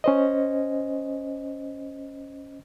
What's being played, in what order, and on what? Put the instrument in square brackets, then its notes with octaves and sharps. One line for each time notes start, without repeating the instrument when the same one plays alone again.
[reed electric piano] C#4 C5 D#5